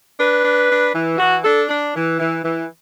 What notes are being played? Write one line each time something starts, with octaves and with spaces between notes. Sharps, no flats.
D4 B4
D4
D4
E3
E3 F#4
D4 A4
D4
E3
E3
E3